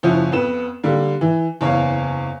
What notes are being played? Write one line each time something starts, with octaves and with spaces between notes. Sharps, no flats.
F#1 F3 C#4 E4 F#5
F2 B3 E7
D3 G3 A#3
E3
F#1 E2 C#5 F5